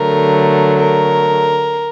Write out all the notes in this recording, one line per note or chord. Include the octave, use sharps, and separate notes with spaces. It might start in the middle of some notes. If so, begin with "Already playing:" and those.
Already playing: D3 F#3 A3 A#4
A#4